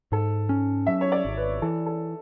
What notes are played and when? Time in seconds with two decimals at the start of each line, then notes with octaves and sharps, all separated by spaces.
0.12 G#2 A4
0.49 C#4
0.87 F#3 E5
1.01 C#5
1.12 D5
1.25 G#1
1.37 B4
1.62 E3 A4
1.86 A4